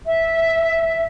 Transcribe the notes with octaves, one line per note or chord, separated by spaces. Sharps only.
E5